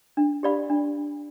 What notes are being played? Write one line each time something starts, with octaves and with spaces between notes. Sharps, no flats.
D4
G4 D5 F5 B5
D4